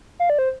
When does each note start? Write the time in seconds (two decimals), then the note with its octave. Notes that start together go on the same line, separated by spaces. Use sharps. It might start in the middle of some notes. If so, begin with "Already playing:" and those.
0.20 F5
0.30 D5
0.39 C5